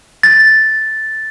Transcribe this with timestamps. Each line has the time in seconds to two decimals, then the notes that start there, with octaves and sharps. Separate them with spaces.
0.23 A6